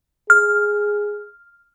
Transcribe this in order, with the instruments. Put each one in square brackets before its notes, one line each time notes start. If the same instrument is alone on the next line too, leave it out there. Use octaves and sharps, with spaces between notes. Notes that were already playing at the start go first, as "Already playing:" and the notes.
[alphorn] G#4 [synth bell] F6